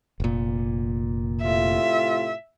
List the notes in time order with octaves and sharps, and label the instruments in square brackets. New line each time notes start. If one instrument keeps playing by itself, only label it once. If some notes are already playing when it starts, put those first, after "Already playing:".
[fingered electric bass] F1 A#2
[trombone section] A2 C3 F4 [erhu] E5